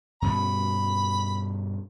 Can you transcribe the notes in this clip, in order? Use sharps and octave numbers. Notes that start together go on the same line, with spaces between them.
G2 B2 C#4 B5